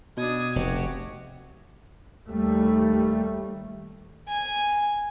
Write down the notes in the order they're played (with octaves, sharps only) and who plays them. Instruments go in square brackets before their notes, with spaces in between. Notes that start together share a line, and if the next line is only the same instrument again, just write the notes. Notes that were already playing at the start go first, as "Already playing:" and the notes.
[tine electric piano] B2 [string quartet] D4 D#6 G#6
[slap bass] F1 [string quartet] F#4 G4
[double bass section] D#2 G3 A3
[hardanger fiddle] G#5